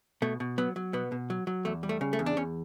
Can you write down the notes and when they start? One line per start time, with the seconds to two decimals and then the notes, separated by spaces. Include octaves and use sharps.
0.22 B2 A3
0.40 B2
0.58 F#3 B3
0.76 F#3
0.93 B2 B3
1.12 B2
1.30 F#3
1.47 F#3
1.65 E2 A3
1.83 G3
1.89 A3
2.01 C#3
2.13 A3
2.19 E2
2.26 D4
2.37 E2 C#4